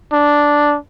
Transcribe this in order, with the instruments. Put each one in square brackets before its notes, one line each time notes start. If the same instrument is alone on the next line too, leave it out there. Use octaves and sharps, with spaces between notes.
[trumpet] D4